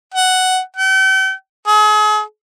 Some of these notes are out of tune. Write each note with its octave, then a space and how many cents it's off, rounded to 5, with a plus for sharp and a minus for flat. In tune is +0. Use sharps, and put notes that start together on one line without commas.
F#5 +5
G5 -40
G#4 +40